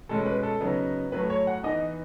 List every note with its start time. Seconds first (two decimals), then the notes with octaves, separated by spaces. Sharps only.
0.09 B2 G#3 C#4 A4
0.26 B4
0.43 A4
0.61 C#3 F#3 B3 D#4
1.12 A2 F#3 A3 B4
1.30 C#5
1.47 F#5
1.63 E3 B3 D#4 D#5